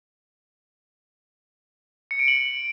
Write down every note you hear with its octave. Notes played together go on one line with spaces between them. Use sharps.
C#7
D7
F#7